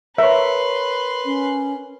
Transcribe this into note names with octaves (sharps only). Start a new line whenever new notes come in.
A#4 B4 C#5 E5 C6
C#4